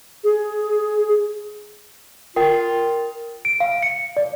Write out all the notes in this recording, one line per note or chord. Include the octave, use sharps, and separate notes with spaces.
G#4
F4 A#4 G5
D7
F5
C#7
D5